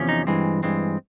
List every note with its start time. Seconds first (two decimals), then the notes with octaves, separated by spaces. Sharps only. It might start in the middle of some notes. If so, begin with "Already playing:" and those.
Already playing: E2 C3 F3 C#4
0.09 D#4
0.27 G2 E3 G#3 C4
0.63 G2 E3 G#3 C4